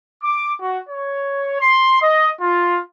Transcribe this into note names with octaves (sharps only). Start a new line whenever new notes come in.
D6
F#4
C#5
C6
D#5
F4